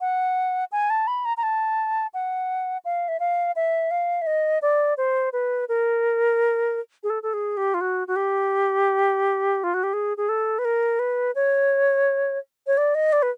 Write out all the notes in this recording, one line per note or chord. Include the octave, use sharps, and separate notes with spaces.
F#5
G#5
A5
B5
A#5
A#5
A5
F#5
F5
E5
F5
E5
F5
E5
D#5
D5
C5
B4
A#4
G#4
A4
A4
G#4
G4
F4
F#4
F#4
G4
F4
F#4
G4
G#4
G#4
A4
B4
A#4
B4
C#5
C#5
D5
D#5
D5
B4